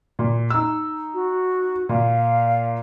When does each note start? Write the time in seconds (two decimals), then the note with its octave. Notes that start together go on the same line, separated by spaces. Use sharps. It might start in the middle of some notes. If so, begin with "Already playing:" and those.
0.19 A#2
0.50 D#4 E6
1.14 F#4
1.89 A#2 F5